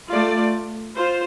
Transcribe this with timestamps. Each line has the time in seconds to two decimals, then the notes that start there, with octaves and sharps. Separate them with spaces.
0.10 A3 F4 D5
0.96 F4 C5